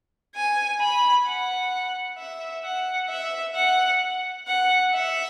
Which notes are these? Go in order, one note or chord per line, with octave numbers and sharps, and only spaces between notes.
G#5
B5
F#5
E5
F#5
E5
F#5
F#5
E5